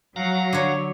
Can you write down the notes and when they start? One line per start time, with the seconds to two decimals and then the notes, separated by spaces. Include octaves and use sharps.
0.16 F#3 F5 F#5 A#5
0.53 D3 C#5